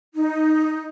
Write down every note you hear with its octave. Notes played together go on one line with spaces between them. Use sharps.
D#4